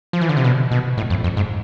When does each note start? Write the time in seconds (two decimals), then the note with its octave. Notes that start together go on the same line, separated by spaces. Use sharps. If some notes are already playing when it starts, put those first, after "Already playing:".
0.13 F3
0.21 E3
0.29 D3
0.37 C3
0.44 B2
0.71 B2
0.97 A2
1.10 F2
1.24 F2
1.37 G#2